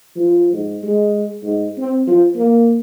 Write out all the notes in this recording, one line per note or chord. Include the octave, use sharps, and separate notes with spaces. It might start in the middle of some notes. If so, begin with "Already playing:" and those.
F3
G#2
G#3
G#2
C4
F3
A#3